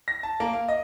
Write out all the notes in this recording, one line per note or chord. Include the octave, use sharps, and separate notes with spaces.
A#6
A5
A#3
F5
D#5